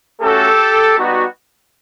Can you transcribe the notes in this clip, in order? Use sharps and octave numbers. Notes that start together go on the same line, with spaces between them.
A3 C#4 F#4 G4 A4
G3 B3 D#4 F#4